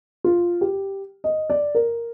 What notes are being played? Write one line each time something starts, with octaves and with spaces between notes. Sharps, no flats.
F4
G4
D#5
D5
A#4